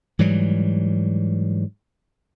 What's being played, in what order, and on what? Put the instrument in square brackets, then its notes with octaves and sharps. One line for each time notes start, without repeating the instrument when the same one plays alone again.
[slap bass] G#2 E3 F#3 G3